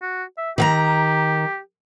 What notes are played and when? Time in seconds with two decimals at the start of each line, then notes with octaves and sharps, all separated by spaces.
0.02 F#4
0.38 E5
0.58 D#3 G4 F5 A#5